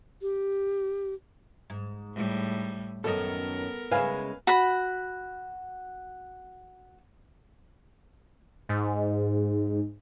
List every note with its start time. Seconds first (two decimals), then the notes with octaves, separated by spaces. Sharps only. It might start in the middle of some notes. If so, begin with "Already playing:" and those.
0.22 G4
1.70 G#2
2.14 A2 G3
3.04 F#2 D#3 B3 D#4 A4 A#4
3.91 C#3 G#3 E4 B4 F5 G#5
4.47 F#4 B5
8.69 G#2